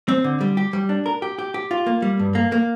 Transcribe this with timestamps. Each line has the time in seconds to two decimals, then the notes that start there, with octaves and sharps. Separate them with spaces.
0.08 C4
0.24 D3
0.41 G3
0.57 G4
0.73 G3
0.89 D4
1.06 A#4
1.22 G4
1.39 G4
1.54 G4
1.71 F4
1.86 A#3
2.02 G3
2.20 G2
2.35 A#3
2.52 A#3